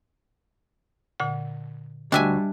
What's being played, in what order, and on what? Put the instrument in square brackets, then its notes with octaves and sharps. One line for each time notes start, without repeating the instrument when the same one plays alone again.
[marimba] A#2 D3 F#5
[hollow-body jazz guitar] D2 [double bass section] G3 [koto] D4 E5 G#5 [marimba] D#5 G5